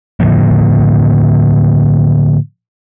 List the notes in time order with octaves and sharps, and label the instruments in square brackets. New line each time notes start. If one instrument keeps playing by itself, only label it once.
[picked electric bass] A2 D3 F3 A#3